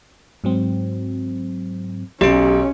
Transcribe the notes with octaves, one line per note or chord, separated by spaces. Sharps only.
G#2 F#3 C4
B1 C#4 G4 C#5 D7